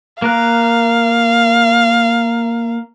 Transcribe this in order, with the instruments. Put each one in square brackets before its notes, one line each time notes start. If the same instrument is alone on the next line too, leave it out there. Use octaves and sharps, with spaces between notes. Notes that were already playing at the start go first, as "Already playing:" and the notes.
[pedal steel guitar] A#3 A#4 F#6 [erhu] F5